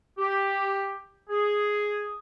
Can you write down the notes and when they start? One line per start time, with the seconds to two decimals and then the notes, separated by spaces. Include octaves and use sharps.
0.18 G4
1.30 G#4